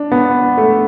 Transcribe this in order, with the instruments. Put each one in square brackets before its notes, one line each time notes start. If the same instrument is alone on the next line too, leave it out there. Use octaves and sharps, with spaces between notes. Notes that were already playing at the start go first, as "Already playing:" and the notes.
Already playing: [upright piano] D4
B3
A3